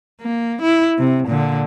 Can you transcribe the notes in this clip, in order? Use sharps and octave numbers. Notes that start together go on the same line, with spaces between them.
A#3
E4
C3
A#2 D3